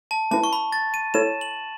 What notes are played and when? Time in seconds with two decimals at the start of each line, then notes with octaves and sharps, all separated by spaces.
0.11 A5
0.31 A3 C#4 E4 B4 A5
0.44 C#6
0.53 B5
0.72 A6
0.94 D#7
1.14 A3 E4 A4 C#5 E7
1.41 F#7